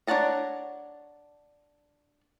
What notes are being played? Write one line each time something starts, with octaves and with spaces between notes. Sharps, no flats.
D4 C#5 F#5 A5 A#5